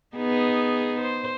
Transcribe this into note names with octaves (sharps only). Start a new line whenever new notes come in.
B3 D#4 G#4
C5